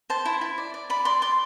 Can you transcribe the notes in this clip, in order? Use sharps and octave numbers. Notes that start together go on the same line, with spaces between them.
C5 A5
E4 B5
E4
D5
D5
D5 B5
D5 C6
D5 C6